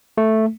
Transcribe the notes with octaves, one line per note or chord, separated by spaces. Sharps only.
A3